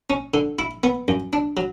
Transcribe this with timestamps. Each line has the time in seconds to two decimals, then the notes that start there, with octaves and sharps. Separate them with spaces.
0.10 C#4
0.34 D3
0.59 E4
0.83 B3
1.08 F#2
1.33 D4
1.57 F#3